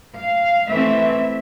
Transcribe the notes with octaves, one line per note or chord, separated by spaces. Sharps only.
F5
E3 A3 C4 E5